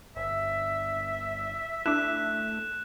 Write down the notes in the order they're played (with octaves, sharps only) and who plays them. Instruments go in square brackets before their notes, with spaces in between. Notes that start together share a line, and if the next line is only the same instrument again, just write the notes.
[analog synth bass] G1 [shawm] E5
[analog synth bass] A3 [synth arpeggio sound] D4 E4 [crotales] F#6 E7